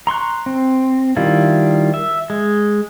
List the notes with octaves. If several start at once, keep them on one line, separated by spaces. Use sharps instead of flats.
A#5 C6 C#6 F#6
C4
D#3 G3 E4 F4
E5
G#3